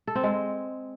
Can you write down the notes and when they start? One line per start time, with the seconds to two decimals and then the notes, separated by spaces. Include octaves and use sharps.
0.07 A4
0.15 C4
0.23 G#3